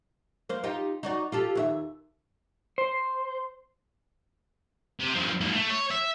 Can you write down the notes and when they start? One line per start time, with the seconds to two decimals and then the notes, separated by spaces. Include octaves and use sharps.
0.49 A#3 C5
0.64 D#4 F4 G4
1.03 D#4 F#4 D5
1.32 F4 G4 A4
1.55 D#2 F#4 E5
2.78 C5
5.00 C3
5.14 G2 F3
5.41 G#2 A#3
5.53 A3
5.70 C#5
5.91 E5